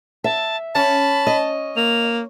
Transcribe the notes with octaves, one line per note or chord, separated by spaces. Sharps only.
E5 A5
C#4 A5 B5
D#5
A#3 F7